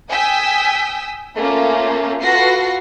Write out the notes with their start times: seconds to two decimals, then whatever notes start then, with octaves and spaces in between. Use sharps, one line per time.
0.10 G5 G#5 D#6 E6 B6
1.35 A3 A#3 C#4 F4
2.22 F4 F#4 A4 B4 A#6 C7